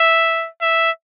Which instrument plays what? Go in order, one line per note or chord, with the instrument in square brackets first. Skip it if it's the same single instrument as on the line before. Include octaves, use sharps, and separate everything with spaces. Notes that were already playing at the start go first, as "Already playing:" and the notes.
Already playing: [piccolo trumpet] E5
E5